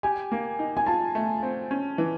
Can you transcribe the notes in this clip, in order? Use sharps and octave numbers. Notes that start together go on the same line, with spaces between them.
G4 G#5
A#3
D#4
G#5
F4 A5
A3
C4
C#4
E3